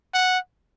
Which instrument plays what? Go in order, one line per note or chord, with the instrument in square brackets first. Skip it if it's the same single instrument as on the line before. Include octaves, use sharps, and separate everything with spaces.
[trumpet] F#5